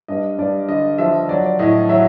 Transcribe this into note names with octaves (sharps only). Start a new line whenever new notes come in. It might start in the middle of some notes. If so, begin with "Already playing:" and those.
G2 D#5
G2 D5
D3 D#5
F3 E5
F#3 D5
D5
A2 D#5
F#3 E5